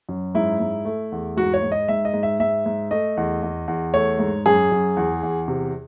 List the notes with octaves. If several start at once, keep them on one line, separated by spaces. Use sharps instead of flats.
F#2
G#2 E4
G#2
A3
E2
G#2 F#4
C#5
G#2
D#5
G#2 E5
D#5
G#2
E5
G#2 E5
G#2
A3 D#5
E2
E2
E2
A3 C#5
G#2
F#2 G#4
F#2
E2
E2
C3